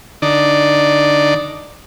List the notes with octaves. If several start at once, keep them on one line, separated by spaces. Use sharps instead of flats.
D3 D#4 D5